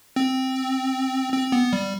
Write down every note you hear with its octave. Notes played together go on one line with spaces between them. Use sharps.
C4
C4
B3
G3